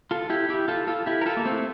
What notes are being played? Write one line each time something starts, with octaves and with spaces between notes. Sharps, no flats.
F4 A4
E4 G4
E4 G4
F4 A4
F4 A4
E4 G4
A#4
F4 A4
A#3
A3 C4